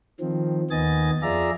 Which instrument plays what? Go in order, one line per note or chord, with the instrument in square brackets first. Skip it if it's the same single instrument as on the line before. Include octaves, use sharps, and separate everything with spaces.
[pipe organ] D#3 F3 C4
D#2 D#3 B3 D#5 G#5 A6
F2 F4 G#4 D5 E5 A#5